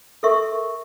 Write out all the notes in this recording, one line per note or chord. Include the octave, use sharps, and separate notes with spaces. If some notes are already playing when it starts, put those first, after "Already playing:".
A4 A#4 E5 C#6